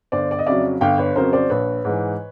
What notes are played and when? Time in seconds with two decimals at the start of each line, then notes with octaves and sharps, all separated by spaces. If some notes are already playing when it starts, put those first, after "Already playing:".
0.12 G1 C5 D5
0.31 D5
0.39 D#5
0.46 F2 C#3 F#3 D5 E5
0.81 G1 F5 G5
0.98 B4 C#5
1.16 F2 C#3 F#3 A#4 C5
1.33 C5 D5
1.50 A#1 B4 C#5
1.85 G#2 E3